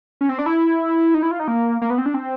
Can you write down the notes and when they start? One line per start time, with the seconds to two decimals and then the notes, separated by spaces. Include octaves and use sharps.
0.21 C#4
0.29 C4
0.39 D4
0.46 E4
1.14 D#4
1.23 E4
1.31 F4
1.40 D#4
1.48 A#3
1.82 A#3
1.90 B3
1.98 C4
2.06 D4
2.14 C4